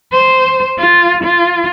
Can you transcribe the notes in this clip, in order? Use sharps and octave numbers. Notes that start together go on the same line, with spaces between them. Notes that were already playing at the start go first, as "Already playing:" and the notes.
C5
F4
F4